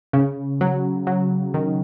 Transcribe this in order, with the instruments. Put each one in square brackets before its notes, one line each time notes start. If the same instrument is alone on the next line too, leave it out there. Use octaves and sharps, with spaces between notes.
[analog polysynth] C#3
F#3
F#3
D#3